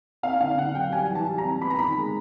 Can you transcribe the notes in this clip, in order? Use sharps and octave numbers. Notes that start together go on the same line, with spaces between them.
C4 F5
D3 F5
D3 F#5
F#3 G5
G3 G#5
E3
A5
G3
A#5
C4
B3 B5
A#5
D#3 B5
G#3